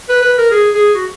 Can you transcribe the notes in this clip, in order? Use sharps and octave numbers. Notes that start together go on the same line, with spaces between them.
B4
B4
A#4
G#4
G#4
F#4